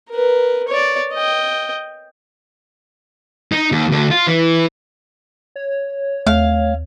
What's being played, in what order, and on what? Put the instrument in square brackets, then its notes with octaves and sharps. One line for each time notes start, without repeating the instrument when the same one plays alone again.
[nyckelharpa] A#4 B4
C#5 D5
D#5 G5
[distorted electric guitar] D#4
D#2
D2 D3
F4
E3
[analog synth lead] C#5
[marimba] D#2 [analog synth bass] A3 [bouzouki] F5